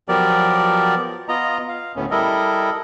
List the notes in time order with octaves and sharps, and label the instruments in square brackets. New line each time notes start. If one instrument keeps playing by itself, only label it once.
[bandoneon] F3 F#3 B3 G4 A#4 D5
B3 F4 D#5 A#5
F5
D2 A2 A3 B3 C#4
G3 E4 A4 A#4 D#5